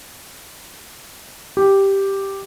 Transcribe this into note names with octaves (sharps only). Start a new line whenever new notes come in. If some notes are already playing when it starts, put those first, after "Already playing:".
G4